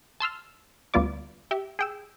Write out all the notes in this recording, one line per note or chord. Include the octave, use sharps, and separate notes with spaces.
A5 C6 E6 F6
D2 G3 B3 F4 D5 D6
G4 E5
G#4 G5 E6